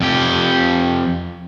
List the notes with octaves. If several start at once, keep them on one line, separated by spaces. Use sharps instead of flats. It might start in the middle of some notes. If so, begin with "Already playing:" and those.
F2 G4